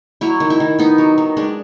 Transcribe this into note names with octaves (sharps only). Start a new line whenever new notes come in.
F#3 E4
D#3
E4
D#3
B3 D#4
F#3
D#3
G#3 D4